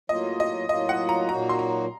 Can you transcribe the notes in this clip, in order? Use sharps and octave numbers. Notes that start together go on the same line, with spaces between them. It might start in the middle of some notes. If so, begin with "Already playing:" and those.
A2 F#3 A#3 F4 D#5
D#5
A2 F#3 A#3 F4 D#5
F#5
A#5
A#2 F#3 A#3 D#4 F#4 A#5
C6
A#5